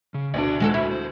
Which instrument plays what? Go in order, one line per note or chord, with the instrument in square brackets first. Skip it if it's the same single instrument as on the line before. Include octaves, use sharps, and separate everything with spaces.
[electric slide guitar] C#3
[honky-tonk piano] D2 B2 D3 [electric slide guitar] D5 G5 A5
[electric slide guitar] D#3 F4 [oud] G#3 F#4 A4
[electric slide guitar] A3 C5 E5 [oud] E4
[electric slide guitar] C5